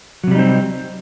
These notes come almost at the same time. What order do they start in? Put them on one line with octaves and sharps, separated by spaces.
F#3 C3 G3 D#4 C4